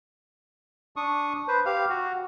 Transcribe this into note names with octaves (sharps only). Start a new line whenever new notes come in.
D4 C#6 D#6
B4 C5
G4 F5
F#4